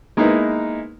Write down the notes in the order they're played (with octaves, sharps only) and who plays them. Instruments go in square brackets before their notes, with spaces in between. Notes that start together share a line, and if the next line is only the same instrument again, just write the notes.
[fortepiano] G#3 A#3 B3 D#4 E4 B4